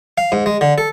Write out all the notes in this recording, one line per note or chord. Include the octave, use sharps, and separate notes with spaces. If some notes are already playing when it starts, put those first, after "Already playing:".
F5
G#2
G#3
D3
A4